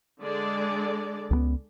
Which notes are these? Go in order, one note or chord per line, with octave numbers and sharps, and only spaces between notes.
D3 G#3 D5
C#2 F#3 B3